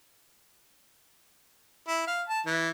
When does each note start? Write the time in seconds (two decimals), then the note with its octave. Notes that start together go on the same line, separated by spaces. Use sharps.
1.88 E4
2.07 F5
2.28 A5
2.46 E3